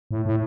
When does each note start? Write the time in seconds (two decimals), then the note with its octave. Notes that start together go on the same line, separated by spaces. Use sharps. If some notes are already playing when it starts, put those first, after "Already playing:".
0.11 A2
0.26 A2